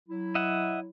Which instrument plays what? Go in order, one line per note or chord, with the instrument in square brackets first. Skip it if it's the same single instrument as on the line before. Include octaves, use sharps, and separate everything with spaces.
[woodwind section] F#3 E4
[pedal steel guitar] D#5 E5 F#5